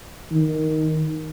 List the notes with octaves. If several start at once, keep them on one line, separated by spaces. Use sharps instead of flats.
D#3